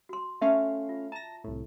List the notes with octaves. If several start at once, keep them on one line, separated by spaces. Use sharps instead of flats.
F#4 C6
A3 C#4 E5 F5
F4
A5 A#5 A#6
C2 A2